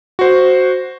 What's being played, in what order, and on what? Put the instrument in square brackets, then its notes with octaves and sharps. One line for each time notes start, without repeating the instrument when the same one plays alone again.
[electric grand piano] F#4 C5